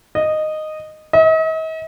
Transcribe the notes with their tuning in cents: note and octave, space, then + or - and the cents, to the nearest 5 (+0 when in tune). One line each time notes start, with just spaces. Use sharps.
D#5 -10
D#5 +45